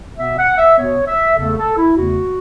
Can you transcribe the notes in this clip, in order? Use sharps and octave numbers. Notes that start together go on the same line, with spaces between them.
B2 B3 E5
F#5
E5
B2 B3 C#5
E5
E2 C#3 A3 A4
A4
E4
E2 C#3 A3 F#4